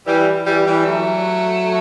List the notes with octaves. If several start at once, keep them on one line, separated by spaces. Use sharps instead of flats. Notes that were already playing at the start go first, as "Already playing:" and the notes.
E3 G3
E3 G3
E3 G3
F#3 A3